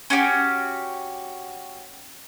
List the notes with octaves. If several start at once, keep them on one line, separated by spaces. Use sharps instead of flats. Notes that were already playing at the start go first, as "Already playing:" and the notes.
C#4 F#4 G4